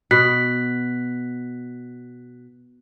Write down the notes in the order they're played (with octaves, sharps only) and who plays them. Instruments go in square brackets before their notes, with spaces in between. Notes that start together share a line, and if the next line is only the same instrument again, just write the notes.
[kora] B2 [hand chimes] F#6 B6